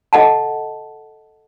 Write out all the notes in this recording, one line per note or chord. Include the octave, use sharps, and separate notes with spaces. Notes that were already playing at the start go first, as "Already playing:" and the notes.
A4 D#5 F#5 A5